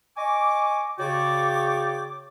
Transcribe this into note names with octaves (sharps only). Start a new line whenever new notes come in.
D#5 G#5 C#6 D6
C#3 F#4 C#5 D5 G5 D6